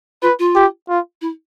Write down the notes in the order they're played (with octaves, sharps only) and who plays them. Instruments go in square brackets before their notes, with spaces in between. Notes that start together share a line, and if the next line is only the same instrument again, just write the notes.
[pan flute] F4 [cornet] B4
[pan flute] F4
[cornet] G4
F4
[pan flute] E4